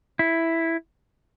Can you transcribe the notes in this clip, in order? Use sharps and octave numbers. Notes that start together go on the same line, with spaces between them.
E4